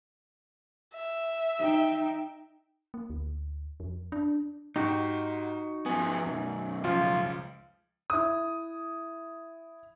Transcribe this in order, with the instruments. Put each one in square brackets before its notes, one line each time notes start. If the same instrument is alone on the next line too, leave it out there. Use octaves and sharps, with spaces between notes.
[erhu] E5
[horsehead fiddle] D#4 G5
[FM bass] A#3
D2
F2
D4
[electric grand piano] G#2 G4 G5 [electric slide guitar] D#4 F#4
[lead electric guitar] F3 B3 [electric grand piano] G#5
[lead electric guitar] B1 F#2
[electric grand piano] C#2 F3 [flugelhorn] F4
[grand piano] E4 D#6